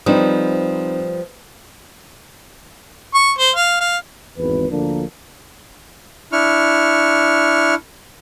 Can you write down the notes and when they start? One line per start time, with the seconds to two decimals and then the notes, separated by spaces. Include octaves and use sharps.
0.06 F3 G3 C4 D#4 B4 C5 D#6
3.14 C#6
3.38 C5
3.56 F5
3.80 F5
4.37 G#1 E2 B4
4.70 D2 D3 F3 A#3 D4 A#4
6.32 D4 E4 C#6 F6